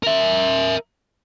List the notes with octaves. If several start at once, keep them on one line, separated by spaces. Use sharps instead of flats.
A#4 E5